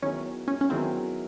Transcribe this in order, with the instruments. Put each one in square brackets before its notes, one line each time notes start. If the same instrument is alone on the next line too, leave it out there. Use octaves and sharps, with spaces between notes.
[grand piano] D#3 F#3 B3 E4 G#4 [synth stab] C#4
[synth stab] C#4
C#4
[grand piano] D#3 F#3 B3 E4 G#4 [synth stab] C4